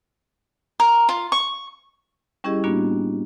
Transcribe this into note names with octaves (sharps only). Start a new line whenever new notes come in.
A#4
F4
C#6
G3 C#4 E4 G4 G#4 D#5
A2 G3 A#3 B3 D4 F#4